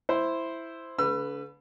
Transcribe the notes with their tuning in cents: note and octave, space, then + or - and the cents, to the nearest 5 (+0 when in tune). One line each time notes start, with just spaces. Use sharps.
E4 +0 C5 +0
D3 -45 B4 +0 E6 +35